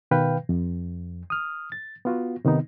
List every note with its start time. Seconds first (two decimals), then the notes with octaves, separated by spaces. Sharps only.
0.11 B2 D#3 B4 F5 G5
0.49 F2
1.30 D#6 F6
1.72 A6
2.05 B3 F4 F#4
2.45 C3 D#3 B3 D#4